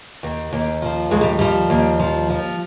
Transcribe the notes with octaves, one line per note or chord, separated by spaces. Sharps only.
D#2
D#2
F3
D#2 G#3
G3
F3 G3
D#2
F3
F3